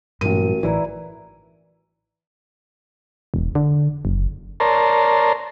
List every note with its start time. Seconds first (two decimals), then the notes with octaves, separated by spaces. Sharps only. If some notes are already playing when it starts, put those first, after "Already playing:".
0.21 A1 G2 A#2 F#3 F#4 A#4 D#7
0.63 A1 E3 E4 D5 A#5
3.34 E1
3.55 D3
4.05 F#1
4.60 A#4 C#5 D5 A5 A#5 C6